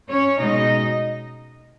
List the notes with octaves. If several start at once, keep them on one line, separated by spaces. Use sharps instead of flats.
C#4 C#5
B2 G#3 C#4 D#4 D#5